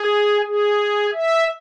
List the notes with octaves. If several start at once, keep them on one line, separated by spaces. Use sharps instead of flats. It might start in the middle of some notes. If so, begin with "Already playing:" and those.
Already playing: G#4
G#4
E5